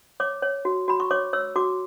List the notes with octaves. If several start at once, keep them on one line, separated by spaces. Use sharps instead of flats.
C#5 D6
C#5
F#4
F#4 B5
C#6
C#5 D6
C#5 E6
F#4 D6